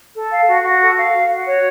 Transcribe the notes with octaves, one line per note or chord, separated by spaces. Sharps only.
A4
F5
F#4
F#4
A4
F5
F#4
F#4
C#5